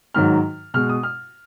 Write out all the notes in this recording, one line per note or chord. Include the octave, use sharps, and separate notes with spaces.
G#2 D#3 F#3 F6
B2 G#3 F6
D#6
F6